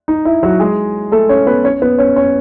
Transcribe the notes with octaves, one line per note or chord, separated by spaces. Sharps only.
D#4
E4
F#3 F#4
G#3 G#4
A3 A4
C#4 C#5
B3 B4
C#4 C#5
B3 B4
C#4 C#5
C#4 C#5